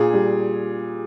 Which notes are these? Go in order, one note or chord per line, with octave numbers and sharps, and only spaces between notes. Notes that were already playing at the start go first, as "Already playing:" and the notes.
Already playing: A#2 G#4
G3